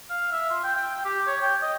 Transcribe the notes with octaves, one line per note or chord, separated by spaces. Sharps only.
F5
E5
F4
G5
G5
G4
C#5
G5
D#5